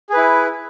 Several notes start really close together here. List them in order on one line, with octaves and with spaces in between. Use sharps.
G#4 B4 E4